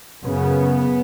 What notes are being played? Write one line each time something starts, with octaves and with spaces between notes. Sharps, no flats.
F#2 C#3 B3